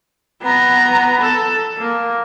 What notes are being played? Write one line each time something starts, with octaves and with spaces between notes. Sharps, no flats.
B3 A#5
A4
A#3